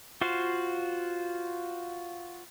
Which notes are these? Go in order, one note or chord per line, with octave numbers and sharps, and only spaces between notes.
F4 F#4 C5 F5